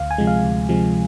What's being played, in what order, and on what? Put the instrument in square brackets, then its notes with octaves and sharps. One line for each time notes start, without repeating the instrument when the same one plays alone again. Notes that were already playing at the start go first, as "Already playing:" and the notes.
Already playing: [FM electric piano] D2 F5
G#5
C3 F3 G#3
F5
D2
C3 F3 G#3